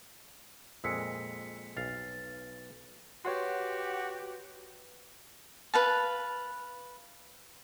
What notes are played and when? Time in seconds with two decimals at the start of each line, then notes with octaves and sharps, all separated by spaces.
0.84 F2 A#2 G#3 E6 B6 C#7
1.77 B1 F5 A6
3.25 F#4 G4 B4 C#5 F#5 C6
5.74 B4 F5 A5